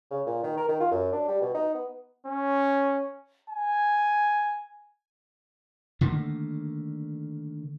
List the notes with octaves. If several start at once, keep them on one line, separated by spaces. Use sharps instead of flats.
C#3
A#2
D#3
A#4
D#3
F4
F#2
D4
G3
B2
D#4
B3
C#4
G#5
D3 D#3 A3 A#3